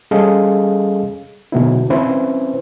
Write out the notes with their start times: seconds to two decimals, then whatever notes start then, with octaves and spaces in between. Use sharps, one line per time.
0.11 G3 C#4 G#4 A4 D#5 F5
1.52 B2 D3 F#3 B3 D#4 E4
1.90 C4 C#4 E4 B4 C5